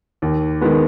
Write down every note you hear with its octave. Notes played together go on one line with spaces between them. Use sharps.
D#2
D#3 G#3 B3